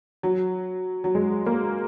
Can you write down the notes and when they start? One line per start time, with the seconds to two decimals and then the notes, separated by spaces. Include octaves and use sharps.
0.23 F#3
1.04 F#3
1.15 G#3
1.46 A#3